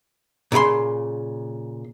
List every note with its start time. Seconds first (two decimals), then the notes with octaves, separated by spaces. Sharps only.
0.52 A#2 C#3 D5 B5 C6